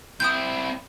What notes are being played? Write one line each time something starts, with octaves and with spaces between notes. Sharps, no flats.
C4 E4 D#6 G6